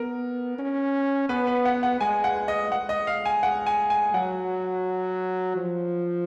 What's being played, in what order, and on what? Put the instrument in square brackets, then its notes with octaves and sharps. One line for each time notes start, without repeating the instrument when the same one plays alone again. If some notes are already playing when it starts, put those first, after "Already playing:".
Already playing: [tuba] B3 [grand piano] A#4
[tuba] C#4
[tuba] B3 [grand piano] B4
[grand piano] B4
F#5
F#5
[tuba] G#3 [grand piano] G#5
[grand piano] F#5
D#5
[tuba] G#3 [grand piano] F#5
[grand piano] D#5
F5
G#5
F#5
G#5
G#5
[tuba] F#3 [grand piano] F#5
[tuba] F3